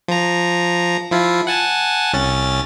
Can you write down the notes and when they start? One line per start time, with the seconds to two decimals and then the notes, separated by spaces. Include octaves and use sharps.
0.08 F3 A#5
1.11 F3 E4 F4
1.47 F#5 G#5 A5
2.13 C2 C#4 A6